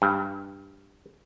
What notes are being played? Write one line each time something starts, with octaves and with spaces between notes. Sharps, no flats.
G2